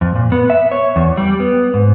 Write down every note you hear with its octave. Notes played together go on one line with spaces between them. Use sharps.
F2
A#2
B3
E5
C#5
E2
G3
B3
G#2